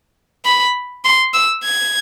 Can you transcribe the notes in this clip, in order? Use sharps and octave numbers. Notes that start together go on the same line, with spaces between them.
B5
C6
E6
G#6